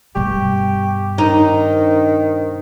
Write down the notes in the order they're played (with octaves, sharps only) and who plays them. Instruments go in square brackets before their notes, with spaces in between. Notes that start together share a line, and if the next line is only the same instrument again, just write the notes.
[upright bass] G2 B2 [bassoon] G4 [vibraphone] C#6
[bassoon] D#3 [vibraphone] D4 C5 [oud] D#4